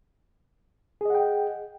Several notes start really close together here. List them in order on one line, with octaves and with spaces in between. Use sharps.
G#4 D#5 F#5 G5